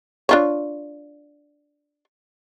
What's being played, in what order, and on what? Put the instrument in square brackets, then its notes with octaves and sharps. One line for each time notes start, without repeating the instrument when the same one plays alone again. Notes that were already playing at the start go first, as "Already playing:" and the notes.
[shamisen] D4 F4 C#5